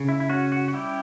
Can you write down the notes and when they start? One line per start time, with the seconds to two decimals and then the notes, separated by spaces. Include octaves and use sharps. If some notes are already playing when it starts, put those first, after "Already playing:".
Already playing: C#3
0.09 E4
0.20 E4
0.29 C#4 F#4
0.52 F#4
0.68 F#4
0.73 G3 E4 G4